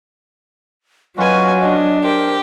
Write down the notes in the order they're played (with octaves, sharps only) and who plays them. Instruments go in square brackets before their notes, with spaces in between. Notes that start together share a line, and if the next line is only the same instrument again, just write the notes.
[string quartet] F#3 [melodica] C#4 F4 F#4 [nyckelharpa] B4 G#5 [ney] D#5
[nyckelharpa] D4 [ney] D#5
[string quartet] G4 [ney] A#4 [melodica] C5